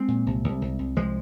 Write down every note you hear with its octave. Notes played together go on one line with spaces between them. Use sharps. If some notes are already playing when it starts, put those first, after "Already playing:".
Already playing: G#3 C4
A#2
C2
C2
C2
C2
C2 F3 G#3